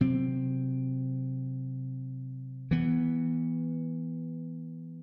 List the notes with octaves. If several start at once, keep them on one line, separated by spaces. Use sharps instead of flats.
C3 F#3 C4
E3 B3